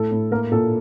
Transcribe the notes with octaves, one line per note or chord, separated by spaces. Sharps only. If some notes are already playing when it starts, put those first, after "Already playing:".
Already playing: A2 A4
A2
A#3 A#4
A#2 A4